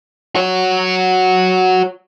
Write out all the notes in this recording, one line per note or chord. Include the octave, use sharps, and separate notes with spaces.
F#4 C#5